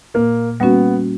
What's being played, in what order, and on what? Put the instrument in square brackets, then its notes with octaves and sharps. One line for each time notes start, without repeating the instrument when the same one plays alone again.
[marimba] A#2 [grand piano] A#3
[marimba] G3 A#3 C#4 F#4 [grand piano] B3